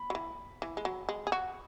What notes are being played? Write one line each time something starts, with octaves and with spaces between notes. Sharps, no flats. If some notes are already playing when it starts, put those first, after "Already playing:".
Already playing: B5
F#3
E3
E3
G#3
F#3
G#3
G#4
F#4